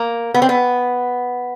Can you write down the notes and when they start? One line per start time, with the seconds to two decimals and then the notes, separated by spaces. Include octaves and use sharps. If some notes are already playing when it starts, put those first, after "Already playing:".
Already playing: A#3
0.34 B3
0.42 C4
0.49 B3